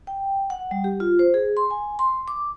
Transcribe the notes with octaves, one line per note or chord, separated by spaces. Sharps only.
G5
F#5
G3
G4
F4
C5
G#4
C6
G#5
C6
D6